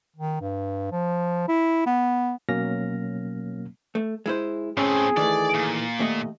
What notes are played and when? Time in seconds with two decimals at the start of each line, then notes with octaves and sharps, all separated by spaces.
0.16 D#3
0.41 G2
0.92 F3
1.48 E4
1.86 B3
2.49 B2 F#3 A#3 C#4 F6 A#6
3.95 A3
4.26 G#3 E4 C5
4.77 A2 C4 C#4 G#4
5.17 D#3 E3 A3 D5
5.55 A#2
5.99 D#2 A3 D#5